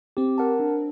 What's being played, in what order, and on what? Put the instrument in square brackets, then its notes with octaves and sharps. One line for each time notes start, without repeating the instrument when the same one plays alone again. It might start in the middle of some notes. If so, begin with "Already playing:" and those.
[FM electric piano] C4 [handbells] G4
[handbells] A#4 F#5 A5
D4